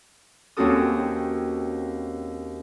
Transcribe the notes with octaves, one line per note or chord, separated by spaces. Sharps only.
D#2 C4 C#4 F#4 A4 D#6